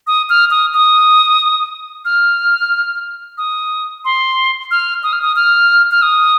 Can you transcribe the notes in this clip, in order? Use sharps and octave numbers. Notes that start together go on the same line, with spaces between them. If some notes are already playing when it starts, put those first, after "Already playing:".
D#6
F6
D#6
D#6
F6
D#6
C6
F6
D#6
F6
D#6
F6
F6
D#6